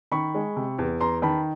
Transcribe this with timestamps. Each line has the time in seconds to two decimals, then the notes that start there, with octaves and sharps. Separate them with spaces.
0.12 D#3 B5 C#6
0.35 G#3
0.56 C3
0.79 E2
1.00 E2 A#5 C6
1.22 D#3 A5 B5